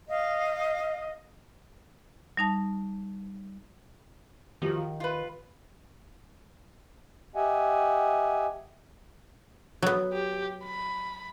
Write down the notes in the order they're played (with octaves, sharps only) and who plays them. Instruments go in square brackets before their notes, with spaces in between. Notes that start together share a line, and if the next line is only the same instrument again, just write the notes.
[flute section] D#5 F5
[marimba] G3 D#4 A5
[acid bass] D#3 [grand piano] F3 F#4 F#7 [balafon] G4
[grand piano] F5
[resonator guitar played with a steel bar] F4 B4
[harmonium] G4 D#5 E5 F#5 G#5
[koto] F#3 B3
[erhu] G4
B5